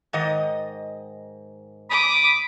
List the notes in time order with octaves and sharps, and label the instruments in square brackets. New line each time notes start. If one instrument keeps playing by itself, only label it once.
[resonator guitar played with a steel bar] G#2 D#3 D#5
[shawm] B5 [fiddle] D6 D#6